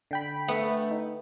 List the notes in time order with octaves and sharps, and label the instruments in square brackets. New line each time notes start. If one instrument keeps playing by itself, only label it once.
[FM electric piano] D3 G5 B5
[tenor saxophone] A3 [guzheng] B3
[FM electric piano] D#4